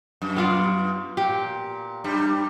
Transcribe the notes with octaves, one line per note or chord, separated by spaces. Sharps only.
F#2
B3 F4 D5
A#2 G4
G2 G3